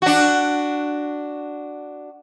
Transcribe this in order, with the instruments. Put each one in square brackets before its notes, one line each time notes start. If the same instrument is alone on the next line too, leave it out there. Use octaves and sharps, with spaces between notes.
[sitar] D4 F#4